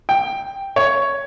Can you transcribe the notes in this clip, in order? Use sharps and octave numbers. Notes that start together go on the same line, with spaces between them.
G5
C#5